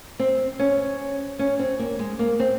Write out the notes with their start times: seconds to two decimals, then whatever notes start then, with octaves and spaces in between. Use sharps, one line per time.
0.19 C4
0.59 C#4
1.39 C#4
1.59 C4
1.79 A#3
1.99 G#3
2.19 A#3
2.40 C4